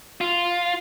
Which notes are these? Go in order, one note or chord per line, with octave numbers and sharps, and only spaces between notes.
F4